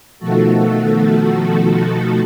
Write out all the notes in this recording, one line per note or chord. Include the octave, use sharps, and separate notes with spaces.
B2 D#3 F3 A3 F#4 A4